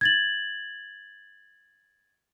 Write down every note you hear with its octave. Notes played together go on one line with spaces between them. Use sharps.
G#6 A6 F#7